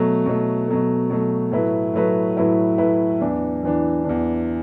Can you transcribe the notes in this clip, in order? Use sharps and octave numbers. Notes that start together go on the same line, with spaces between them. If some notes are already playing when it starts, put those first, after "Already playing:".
Already playing: B2 F#3 A3
B2 F#3 A3
B2 F#3 A3
B2 F#3 A3
A2 F#3 A3 E4 B4
A2 F#3 A3 E4 B4
A2 F#3 A3 E4 B4
A2 F#3 A3 E4 B4
E2 E3 D4
E2 E3 D4
E2 E3 D4